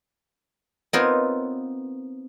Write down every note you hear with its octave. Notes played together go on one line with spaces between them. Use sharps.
B3 C4 D#4 F4 A#4 C#5